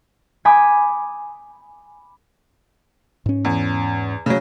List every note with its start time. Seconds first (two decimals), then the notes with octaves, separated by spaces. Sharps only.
0.45 G#5 B5 D6 D#6 G6
3.26 G#2 C#4
3.45 E2
4.26 C#3 F#3